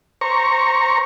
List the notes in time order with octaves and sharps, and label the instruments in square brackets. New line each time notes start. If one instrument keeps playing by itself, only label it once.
[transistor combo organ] C5 A#5 C#6